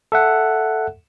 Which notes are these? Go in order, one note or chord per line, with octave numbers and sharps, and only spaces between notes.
A4 E5 F#5